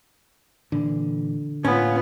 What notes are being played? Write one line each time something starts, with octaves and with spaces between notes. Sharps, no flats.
A#2 D3 E3
A2 A#3 B3 C#4 F4